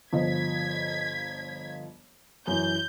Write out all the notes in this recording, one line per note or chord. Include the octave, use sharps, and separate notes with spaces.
G1 F3 D#5 G#6 B6
F#2 E3 G6